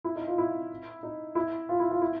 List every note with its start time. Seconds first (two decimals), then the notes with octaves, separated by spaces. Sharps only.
0.04 E4
0.16 D#4
0.27 F4
0.38 E4
1.03 D#4
1.35 E4
1.69 F4
1.80 E4
1.91 F4
2.02 E4